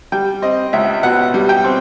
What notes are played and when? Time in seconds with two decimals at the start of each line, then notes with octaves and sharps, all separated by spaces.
0.12 G3 G5
0.42 C4 D#5
0.73 C#2 E5
1.03 B2 F#5
1.34 G3
1.49 G5
1.65 C4